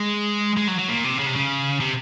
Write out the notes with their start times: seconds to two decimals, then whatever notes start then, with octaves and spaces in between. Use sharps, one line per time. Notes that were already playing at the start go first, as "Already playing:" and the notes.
Already playing: G#3
0.57 G#3
0.68 F#3
0.79 F#3
0.89 A#2
1.05 C3
1.19 C#3
1.27 C3
1.36 C#3
1.80 C3